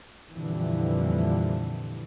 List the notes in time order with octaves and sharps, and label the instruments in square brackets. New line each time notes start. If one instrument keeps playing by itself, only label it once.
[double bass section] F2 A#2 D3 E3 G3